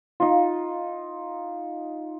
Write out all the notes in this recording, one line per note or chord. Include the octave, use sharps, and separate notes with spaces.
D#4 F4